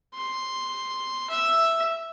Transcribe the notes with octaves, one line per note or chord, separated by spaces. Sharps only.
C6
E5